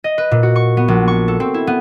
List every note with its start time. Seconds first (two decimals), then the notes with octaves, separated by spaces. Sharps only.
0.04 D#5
0.18 B4
0.31 A#2
0.43 F#4
0.56 C#6
0.77 B3
0.88 A#1
1.08 C#6
1.28 A4
1.40 C4
1.54 E4
1.67 B3